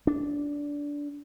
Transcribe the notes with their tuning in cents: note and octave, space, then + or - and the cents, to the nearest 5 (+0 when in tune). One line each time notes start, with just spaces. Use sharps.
D4 -15